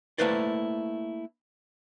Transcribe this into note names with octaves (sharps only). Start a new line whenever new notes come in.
A3 A#3 E4 B4 C5 D5